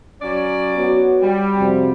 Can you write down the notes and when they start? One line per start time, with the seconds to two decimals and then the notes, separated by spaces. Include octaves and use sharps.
0.22 F#3 C#4 D5
0.76 B3 F#4 C#5
1.21 G3
1.57 F2 C3 F#4